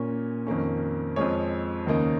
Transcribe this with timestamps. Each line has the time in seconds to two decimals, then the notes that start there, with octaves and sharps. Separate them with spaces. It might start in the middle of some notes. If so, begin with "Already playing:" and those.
Already playing: A#2 A#3 C#4
0.47 F2 D#3 A#3 C#4
1.16 F2 F3 G#3 C#5
1.87 D#2 C#3 A#3 D#4